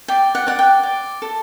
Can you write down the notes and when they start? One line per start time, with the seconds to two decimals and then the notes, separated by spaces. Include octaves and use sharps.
0.08 D5 G5
0.35 F#5
0.47 D5 F#5
0.59 G5
0.83 D5
1.22 A4